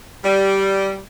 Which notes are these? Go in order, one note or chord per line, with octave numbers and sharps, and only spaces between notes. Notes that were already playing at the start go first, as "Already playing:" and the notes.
G3